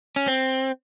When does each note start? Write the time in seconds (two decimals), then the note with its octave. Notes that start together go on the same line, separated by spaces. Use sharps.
0.16 C#4
0.28 C4